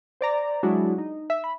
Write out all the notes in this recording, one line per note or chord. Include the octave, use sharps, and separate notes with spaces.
C5 D5 A#5
F#3 G#3 D4 E4 F#4
D#4
E5
B5